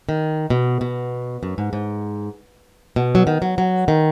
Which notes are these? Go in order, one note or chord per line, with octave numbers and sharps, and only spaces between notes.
D#3
B2
B2
F#2
G#2
G#2
B2
F#3
D#3
F#3
F#3
D#3